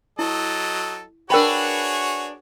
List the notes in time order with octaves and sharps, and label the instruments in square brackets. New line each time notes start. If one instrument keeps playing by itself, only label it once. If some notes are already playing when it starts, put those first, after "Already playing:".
[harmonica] F#3 A4 D#5 [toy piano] E4
[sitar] D4 B4 [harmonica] F#4 G#4 C#5 [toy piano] A#4 G5 B5